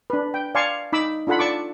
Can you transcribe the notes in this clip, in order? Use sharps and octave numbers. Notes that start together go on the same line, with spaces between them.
D4 B4
G5
D5 F5 G#5 A5 C6 C#6
D#4 B5 D6 E6
D4 F4 A4 F#5 B5
D5 A5 C#6 D6